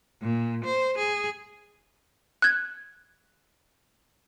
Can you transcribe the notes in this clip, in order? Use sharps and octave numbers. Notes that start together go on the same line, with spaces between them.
A#2
C5
G#4
F#6 G#6